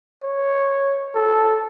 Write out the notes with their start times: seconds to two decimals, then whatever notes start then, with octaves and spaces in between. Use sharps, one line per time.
0.23 C#5
1.15 A4